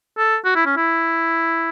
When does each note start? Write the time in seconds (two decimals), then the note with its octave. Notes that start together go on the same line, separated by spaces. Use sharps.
0.18 A4
0.45 F#4
0.56 E4
0.66 C#4
0.77 E4